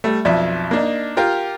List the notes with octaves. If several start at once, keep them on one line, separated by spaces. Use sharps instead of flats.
G3 A3
B1 F2 D5 E5
A#3 D4 D#4
F4 G4 A#4 F5 G5